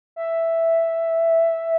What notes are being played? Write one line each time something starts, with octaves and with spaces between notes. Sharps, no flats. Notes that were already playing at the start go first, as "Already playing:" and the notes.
E5